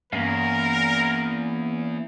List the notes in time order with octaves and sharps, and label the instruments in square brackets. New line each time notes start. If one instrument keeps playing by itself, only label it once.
[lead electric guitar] E2 [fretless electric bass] G2 [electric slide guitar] A#3 C#4 F5 [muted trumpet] A#4